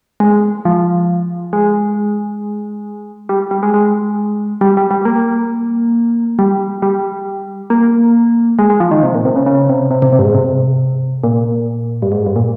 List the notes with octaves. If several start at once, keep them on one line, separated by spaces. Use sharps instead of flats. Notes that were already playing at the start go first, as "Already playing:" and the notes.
G#3
F3
G#3
G3
G3
G#3
G#3
G3
G3
G3
A#3
G3
G3
A#3
G#3
G#3
F3
D#3
C3
A#2
C3
C#3
C#3
C3
C3
C3
C3
G2
G#2
C3
A#2
G2
G#2
G2
A#2